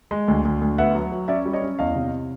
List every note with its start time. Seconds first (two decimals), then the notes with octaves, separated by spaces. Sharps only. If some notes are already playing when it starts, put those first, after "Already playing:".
0.11 G#3
0.28 D2
0.45 D2
0.61 D2
0.78 B3 E5 F#5
0.95 F#3
1.12 F#3
1.28 C#4 D5 E5
1.46 G3
1.53 C#5 D#5
1.62 C#4
1.79 E2 D#5 F5
1.95 C3